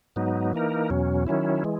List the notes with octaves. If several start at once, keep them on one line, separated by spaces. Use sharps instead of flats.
G#2 F#3 B3 D#4
E3 A#3 D#4 A#4
E2 B2 F#3 C#4
D#3 F#3 C#4 E4
E3 G#3